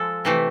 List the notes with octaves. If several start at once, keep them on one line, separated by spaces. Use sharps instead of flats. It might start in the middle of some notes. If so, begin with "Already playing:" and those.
Already playing: F3 G#3 A4
C3 E3 A3